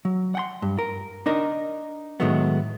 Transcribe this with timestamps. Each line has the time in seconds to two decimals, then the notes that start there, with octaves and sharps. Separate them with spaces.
0.05 F#3
0.35 F#5 G5 C6
0.62 G2
0.79 A#4
1.26 D4 D#4 A#4
2.20 A2 D#3 F#3 G#3 A3 B3